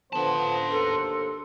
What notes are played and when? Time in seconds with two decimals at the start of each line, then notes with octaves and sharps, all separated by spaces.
0.13 D3 F3 B3 B4 C5 A5
0.71 D#2 D4 A4 A#4